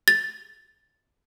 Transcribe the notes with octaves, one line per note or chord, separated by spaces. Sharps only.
A6